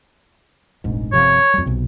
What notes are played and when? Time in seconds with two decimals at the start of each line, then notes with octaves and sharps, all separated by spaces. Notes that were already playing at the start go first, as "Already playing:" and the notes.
0.84 F1 A#1 G#2
1.12 G1 C3 F3 C#5
1.54 F2 G3
1.66 B1 C3